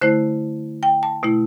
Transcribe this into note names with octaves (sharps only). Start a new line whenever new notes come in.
D3 A3 E4 C5
G5
A5
B2 A3 E4